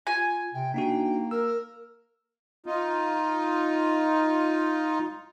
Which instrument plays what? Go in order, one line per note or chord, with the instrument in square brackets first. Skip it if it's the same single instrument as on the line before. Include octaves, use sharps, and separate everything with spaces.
[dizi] F4 [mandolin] G#5
[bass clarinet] C3 [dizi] G5
[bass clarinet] A#3 [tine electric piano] D4 D#4 F#4 [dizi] G5
[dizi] A#4 [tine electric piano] E6
[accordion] D#4 F4